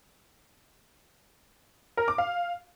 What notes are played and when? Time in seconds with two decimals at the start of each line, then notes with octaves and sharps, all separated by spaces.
1.97 A#4
2.08 D6
2.18 F5